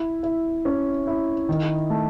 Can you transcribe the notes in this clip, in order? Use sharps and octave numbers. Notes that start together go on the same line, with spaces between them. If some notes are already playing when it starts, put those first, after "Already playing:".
Already playing: E4
E4
C#4
E4
D#3
A3